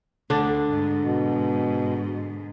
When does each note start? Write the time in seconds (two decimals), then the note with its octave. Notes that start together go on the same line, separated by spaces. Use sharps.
0.30 D2 D3 D4
0.69 G#2
1.02 B2